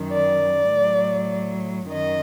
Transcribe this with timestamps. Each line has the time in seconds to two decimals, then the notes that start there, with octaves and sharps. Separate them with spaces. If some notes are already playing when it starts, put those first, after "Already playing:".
Already playing: F#2 D#3 F#3
0.11 D5
0.71 A2 F#3
1.90 F#2 D#3 D#5